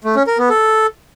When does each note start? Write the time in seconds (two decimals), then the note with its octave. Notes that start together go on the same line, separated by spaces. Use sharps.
0.04 A3
0.16 C#4
0.27 A#4
0.38 B3
0.50 A4